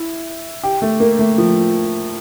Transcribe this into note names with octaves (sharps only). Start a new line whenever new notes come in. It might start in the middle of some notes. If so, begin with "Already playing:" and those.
Already playing: E4
G4
A3
A#3
A3
F3